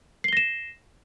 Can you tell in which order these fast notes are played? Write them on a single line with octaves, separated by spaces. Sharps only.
C7 G7 A#6 E7